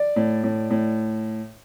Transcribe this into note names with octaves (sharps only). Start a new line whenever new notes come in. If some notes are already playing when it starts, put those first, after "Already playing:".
Already playing: D5
A2
A2
A2